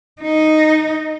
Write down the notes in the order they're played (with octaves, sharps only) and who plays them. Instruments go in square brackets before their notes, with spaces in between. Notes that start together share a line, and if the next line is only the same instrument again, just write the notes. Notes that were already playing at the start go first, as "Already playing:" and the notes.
[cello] D#4